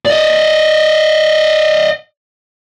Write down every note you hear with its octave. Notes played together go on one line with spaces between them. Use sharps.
D5 D#5